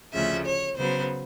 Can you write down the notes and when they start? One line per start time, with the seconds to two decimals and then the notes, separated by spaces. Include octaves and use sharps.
0.13 D2 C#3 F3 E5
0.46 C#5
0.78 C#3 F#3 B3 C5